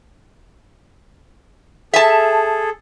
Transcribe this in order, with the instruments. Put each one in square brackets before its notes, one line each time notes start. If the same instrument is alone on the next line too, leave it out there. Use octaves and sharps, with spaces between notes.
[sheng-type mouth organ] G#4 A4 [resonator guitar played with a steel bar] E5 A5